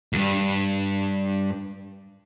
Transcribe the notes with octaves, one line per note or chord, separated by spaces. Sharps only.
D2 G2